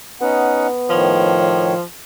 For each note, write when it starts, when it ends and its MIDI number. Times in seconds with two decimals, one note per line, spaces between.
0.21 1.57 59
0.21 0.67 61
0.21 0.67 63
0.21 0.67 78
0.90 1.74 45
0.90 1.74 51
0.90 1.83 53
0.90 1.74 73